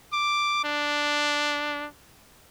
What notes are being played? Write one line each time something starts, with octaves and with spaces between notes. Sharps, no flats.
D6
D4